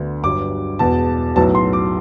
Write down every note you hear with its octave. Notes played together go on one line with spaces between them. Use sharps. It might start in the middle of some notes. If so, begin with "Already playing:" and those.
Already playing: D2 D3 B3
G1 G2 F#3 D6
E1 E2 B2 A5
B1 A2 F#3 B3 A5
C6
D6